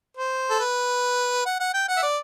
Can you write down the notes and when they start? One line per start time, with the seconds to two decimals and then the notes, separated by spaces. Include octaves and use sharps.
0.17 C5
0.50 A4
0.60 B4
1.46 F#5
1.60 F#5
1.74 G5
1.88 F#5
1.97 E5
2.03 D5